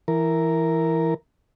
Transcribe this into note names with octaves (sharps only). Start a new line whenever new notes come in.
E3 A#4